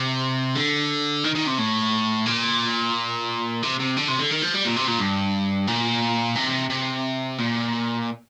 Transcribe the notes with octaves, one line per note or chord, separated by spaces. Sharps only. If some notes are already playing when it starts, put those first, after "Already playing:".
Already playing: C3
D3
D#3
D#3
C3
A2
A#2
C3
C3
D3
C3
D3
D#3
F3
G3
A#2
C3
A#2
G2
A#2
C3
C3
A#2